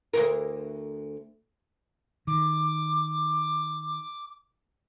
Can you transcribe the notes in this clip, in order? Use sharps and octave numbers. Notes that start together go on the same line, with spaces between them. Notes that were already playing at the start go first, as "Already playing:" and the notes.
D2 G2 A#4
D#3 D6